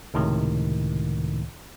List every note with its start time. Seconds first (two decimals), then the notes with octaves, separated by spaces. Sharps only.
0.14 C#2 A2 C3 D#3